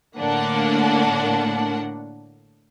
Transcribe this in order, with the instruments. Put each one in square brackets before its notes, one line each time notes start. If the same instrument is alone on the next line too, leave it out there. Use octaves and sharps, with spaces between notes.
[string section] A2 D3 A#3 D4 F#5